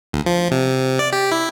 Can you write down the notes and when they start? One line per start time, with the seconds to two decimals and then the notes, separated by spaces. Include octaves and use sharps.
0.13 D2
0.26 F3
0.51 C3
0.99 D5
1.12 G4
1.31 E4